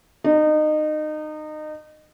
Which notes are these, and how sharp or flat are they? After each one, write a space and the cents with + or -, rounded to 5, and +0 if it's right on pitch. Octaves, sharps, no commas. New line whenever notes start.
D#4 -25